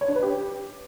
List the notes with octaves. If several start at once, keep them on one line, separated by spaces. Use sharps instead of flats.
C#5
D4
B4
G4